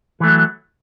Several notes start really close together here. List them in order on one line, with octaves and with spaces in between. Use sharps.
E3 A3 F#3